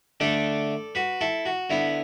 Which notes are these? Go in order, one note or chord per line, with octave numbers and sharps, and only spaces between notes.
D3 A3 D4 A4 D5
F#4 B4
E4 A4
F#4
D3 B3 E4